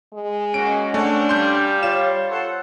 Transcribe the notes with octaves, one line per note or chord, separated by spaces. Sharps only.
G#3
A#3 C#4 F#4 D7
A3 C4 D4 C#5 F#5
G3 F5 C6 G6
F4 C#5 E7
A4 C5 F#5